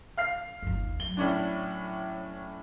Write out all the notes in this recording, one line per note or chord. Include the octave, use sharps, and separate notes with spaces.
F5 F6 C7
G1 D#2
F#3 G7
A2 C#4 D4